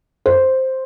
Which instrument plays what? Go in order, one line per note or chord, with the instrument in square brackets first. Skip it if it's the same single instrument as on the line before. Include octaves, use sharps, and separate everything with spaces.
[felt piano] C5